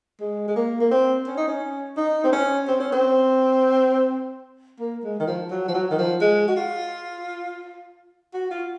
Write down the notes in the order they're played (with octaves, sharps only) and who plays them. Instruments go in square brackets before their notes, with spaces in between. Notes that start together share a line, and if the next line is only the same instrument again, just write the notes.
[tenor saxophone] G#3
G#3
A#3
A#3
C4
C#4
D#4
C#4
D#4
C4
C#4
C4
C#4
C4
A#3
G#3
D#3
F3
F#3
F3
F#3
D#3
F3
G#3
F#4
F4
F#4
F4